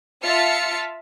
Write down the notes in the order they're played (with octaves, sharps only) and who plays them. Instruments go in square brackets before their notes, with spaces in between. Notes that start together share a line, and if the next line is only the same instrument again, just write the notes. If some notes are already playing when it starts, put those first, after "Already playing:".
[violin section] F4 E5 A5 F6 A6 C#7